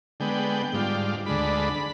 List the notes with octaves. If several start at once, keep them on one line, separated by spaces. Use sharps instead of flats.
D3 G#3 B3 G5
G#2 G3 D4 F4
D2 D3 G#3 D4 B5